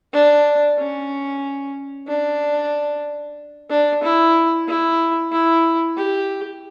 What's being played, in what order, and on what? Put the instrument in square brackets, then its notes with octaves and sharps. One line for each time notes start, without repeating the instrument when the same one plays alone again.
[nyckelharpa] D4
C#4
D4
D4
E4
E4
E4
G4